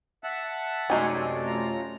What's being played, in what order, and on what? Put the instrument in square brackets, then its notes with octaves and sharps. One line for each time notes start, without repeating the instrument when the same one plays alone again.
[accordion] E5 F#5 A5
[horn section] F#2 C3 D5 [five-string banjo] G#3 D#4 G#5 [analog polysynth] A3 C#4
[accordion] F4 A#5